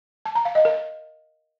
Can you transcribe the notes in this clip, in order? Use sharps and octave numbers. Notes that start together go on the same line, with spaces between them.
A5
A#5
F5
D#5
A#4